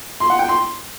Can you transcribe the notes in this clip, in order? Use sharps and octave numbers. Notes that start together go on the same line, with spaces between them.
C6
F#5
G5
C6